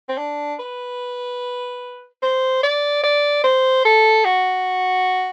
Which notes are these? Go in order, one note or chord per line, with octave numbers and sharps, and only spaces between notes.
C4
D4
B4
C5
D5
D5
C5
A4
F#4